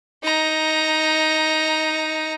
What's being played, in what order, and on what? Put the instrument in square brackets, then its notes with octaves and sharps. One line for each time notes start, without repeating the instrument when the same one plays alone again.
[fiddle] D#4 A#5